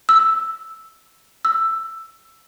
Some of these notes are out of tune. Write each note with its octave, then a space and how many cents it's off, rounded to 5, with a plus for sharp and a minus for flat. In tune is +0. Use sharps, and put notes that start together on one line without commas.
E6 +0
E6 +10